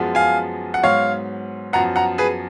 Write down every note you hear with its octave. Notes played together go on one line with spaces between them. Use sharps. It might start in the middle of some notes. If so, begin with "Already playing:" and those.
Already playing: F#2 F3 G#3 B3
F5 G#5
F#5
G#2 F#3 B3 C#5 F5
F#2 F3 B3 F#5 A#5
F#5 A#5
G#4 B4